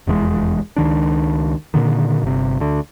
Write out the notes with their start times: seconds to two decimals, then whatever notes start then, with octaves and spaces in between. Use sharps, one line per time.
0.07 F1 E2 A2 G#3
0.76 C#2 D#3 D4
1.74 A#2 D3 D#3
2.22 G1 C3
2.60 D2 D3